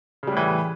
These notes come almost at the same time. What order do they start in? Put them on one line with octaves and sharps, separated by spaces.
C#3 G3 A2 E3